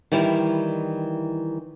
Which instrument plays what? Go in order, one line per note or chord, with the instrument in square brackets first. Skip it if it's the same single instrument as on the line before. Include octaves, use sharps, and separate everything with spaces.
[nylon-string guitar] D#3 E3 G3 E4